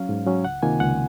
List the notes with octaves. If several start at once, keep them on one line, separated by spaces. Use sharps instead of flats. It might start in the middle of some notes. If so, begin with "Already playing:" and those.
Already playing: F#3 C#4 F5
G#2
F#3 C#4
C#2 F#5
C3 D#3 A#3 F4 G#5
C#2 F#5